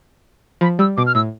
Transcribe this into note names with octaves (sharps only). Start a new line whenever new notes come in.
F3 B5
G3 E6
B2 D6
F6
A2 E6